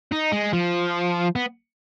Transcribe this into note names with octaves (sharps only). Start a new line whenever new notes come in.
D#4
G#3
F3
B3